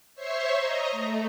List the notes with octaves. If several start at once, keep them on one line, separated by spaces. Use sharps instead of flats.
C5 C#5 E5 C6 C#6
D#5 A#5
A3